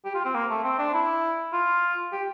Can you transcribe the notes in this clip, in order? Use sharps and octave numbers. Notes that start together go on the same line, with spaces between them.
G4
F4
C4
A#3
A3
C4
D4
E4
F4
G4